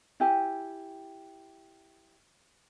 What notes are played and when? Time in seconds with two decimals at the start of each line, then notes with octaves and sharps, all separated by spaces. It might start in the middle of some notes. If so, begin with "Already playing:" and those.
0.20 E4 G4 G#5